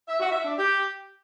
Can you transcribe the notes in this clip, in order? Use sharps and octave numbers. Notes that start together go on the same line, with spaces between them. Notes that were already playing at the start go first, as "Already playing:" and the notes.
E5
F#4
E5
D4
G4